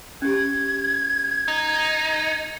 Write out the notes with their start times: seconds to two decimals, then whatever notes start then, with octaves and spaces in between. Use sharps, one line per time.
0.22 C#4 G4 G#6
1.48 D#4